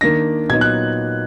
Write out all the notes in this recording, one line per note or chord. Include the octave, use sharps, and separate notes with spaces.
D#3 A#3 D4 A#6
A#2 F#3 B3 D#4 G#6
F#6